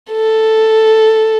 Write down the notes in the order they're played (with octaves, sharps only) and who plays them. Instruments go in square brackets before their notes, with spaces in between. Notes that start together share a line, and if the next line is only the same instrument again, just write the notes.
[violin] A4